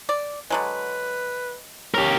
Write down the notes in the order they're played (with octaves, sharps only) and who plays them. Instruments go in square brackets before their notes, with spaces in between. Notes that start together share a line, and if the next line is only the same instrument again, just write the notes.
[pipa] D5
[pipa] D3 F#3 G#3 [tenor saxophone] B4
[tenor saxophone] C#4 [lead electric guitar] G4 A#4